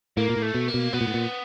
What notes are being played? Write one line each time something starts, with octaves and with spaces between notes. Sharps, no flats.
A2 A#3
A#2
A2
A3
B2
A#3
B2
B2 B3
A#2
A2
A#2